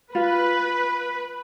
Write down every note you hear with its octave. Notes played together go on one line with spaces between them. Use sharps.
F4 B4